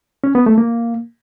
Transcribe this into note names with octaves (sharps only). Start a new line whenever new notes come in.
C#4
B3
A3
A#3